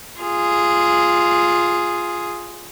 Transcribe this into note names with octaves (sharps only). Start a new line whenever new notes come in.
F4 G#4